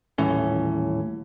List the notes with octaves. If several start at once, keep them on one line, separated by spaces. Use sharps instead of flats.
D#1 A2 E3 C#4